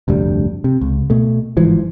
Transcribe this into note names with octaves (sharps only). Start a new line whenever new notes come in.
F1 D2 G2 G3
C3
C#2
B2 A3
G1 G#2 E3 F3